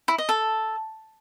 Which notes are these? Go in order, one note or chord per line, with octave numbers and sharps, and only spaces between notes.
E4
D#5
A4